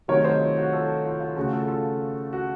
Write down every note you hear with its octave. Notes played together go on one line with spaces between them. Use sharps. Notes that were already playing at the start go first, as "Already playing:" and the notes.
C3 D#3 F#3 A3 A#4 C#5
C5 D#5
F4
F#4
F4 A4
F4 A4
F4
C#3 A3 F#4
F4 A4
F4 A4
F#4